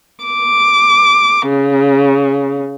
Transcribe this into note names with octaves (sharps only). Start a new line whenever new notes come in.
D6
C#3